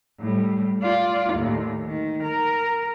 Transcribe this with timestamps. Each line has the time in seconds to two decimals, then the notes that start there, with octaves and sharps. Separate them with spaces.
0.20 A2 G3
0.82 F4 D5
1.34 D#2 A2
1.85 D#3
2.24 A#4